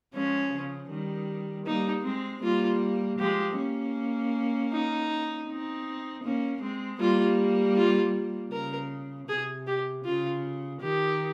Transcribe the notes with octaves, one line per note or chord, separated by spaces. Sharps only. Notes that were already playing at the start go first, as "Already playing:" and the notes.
F3 G#3 C#4
C#3 F3
D#3 G3
G3 A#3 D#4
G#3 C4
G3 A#3 F4
F3 G#3 G4
A#3 C#4
D#4
C4 D#4
A#3 C#4
G#3 C4
G3 A#3 F4
F4
C#3 A#4
C3 G#4
G4
C#3 F4
D#3 G4